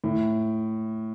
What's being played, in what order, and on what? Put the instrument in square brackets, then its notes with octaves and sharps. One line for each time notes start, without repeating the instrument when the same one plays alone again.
[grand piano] A2